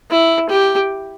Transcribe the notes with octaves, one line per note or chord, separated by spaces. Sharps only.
E4
G4